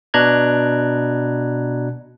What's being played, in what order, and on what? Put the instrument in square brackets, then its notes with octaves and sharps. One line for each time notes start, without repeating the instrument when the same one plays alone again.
[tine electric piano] B2 D4 A#5 F#6 G#6